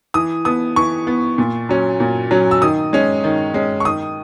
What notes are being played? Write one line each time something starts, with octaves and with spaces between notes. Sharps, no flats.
E3 D#6
B3 D#6
E3 C#6
B3
A#2
F#3 C#4
A#2
F#3 C#4
E6
D#3 D#6
G#3 C#4
D#3
G#3 C#4
C#6
D#3 D#6